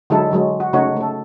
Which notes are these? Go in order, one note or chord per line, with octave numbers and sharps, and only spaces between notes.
D3 F#3 G#3 D#4 E4 A4
D3 F#3 G#3
F#4
C#3 A3 D#4 F#4 C#5
A3 A4